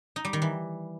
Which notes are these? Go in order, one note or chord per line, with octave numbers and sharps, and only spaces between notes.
D#4
G3
D#3
E3